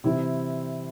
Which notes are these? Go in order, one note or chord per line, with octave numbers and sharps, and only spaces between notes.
C3 E3 G3 C4 E4